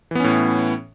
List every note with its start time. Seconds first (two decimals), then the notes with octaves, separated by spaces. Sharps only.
0.11 E3
0.15 B3
0.20 C#4
0.24 A2